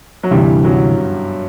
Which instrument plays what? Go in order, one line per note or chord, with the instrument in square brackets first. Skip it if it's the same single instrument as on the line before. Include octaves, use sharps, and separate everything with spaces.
[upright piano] F#3
[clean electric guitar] D2 C3 E3 [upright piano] G2 G3
[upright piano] F#2 F#3